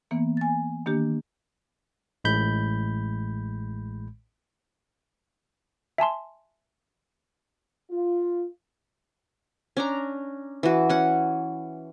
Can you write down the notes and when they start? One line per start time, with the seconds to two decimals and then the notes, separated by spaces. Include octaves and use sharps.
0.11 E3 A#3 B3
0.37 G#5 A6
0.86 D#3 A#3 D4 G4
2.24 A1 A2 G#3 B5 G6
5.98 E5 G#5 A5 C6
7.91 F4
9.77 C#4 D4 A#5
10.63 E3 F#4
10.89 C#4 F#5